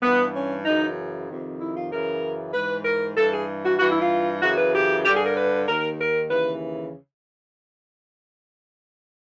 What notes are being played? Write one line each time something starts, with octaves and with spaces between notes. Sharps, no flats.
G2 E3 B3
C#4
F#2 C#3 E3 D#4
F2 C3 D#3
E4
F4
F#2 C#3 E3 A#4
G#2 E3 B4
A#4
G2 E3 A4
G#4
F#4
G2 E3 F#4
E4
F4
F#2 C#3 E3 F#4
B4
G4
G2 D3 G4
G#4
A#4
B4
D#2 D#3 A#4
A#4
D#2 C#3 E3 B4